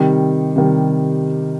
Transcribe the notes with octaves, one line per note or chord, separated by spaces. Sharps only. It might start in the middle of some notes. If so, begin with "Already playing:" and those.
Already playing: C3 D#3 G3
C3 D#3 G3